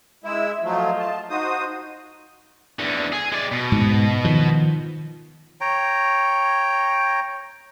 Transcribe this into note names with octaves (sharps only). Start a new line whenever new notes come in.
G#3 E4 E5 E6
F3 F#3 A3 F4 D#5
A5
D#4 F#4 C5 D#6
E2 D3
G#4
G#3 D5
B2
G#2
D#3 F3
C#5 G5 A#5